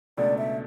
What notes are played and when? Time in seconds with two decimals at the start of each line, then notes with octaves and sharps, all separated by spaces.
0.17 C#2 B2 A3 D4 D5
0.38 E5